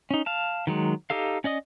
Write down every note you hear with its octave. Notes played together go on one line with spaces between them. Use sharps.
C#4 D#4
F5 A5
D#3 F#3 G#3
D#4 G4 A4 F5
C#4 D5 D#5 D#6